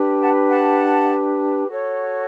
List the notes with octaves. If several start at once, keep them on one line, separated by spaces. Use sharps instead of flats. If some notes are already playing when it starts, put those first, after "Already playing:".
Already playing: D4 G4 B4
F#5 A5
F#5 A5
F#4 A4 C#5